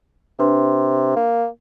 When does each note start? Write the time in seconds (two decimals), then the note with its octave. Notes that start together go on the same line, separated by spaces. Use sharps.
0.39 C3 D4 B4 C6
1.16 A#3